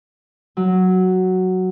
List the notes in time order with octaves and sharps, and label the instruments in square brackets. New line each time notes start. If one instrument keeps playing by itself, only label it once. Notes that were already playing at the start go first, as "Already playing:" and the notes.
[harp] F#3